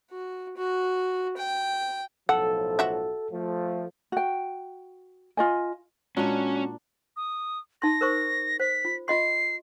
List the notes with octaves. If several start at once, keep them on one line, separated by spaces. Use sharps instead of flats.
F#4
F#4
G5
B1 A2 F3 A4 F#5
F#4 E5
F3 A3
F#4 G5
F4 D#5 G#5
A#2 G#3 C#4 D4 F#4
D#6
D#4 C6 A#6
A#4 C5 C#6
C5 B6
F4
F4 D#5 C6 C7